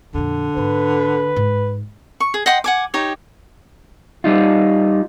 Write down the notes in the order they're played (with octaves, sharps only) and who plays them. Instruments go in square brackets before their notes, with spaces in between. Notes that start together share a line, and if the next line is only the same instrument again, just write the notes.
[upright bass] F2 A#2 [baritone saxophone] D3
[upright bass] G#2 B3 [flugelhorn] B4
[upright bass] G#2
[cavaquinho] C#6
G#4
D#5 F#5 G5 C6
F#5 G#5 D6
D#4 G4 C#5
[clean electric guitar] G3 D#4 F4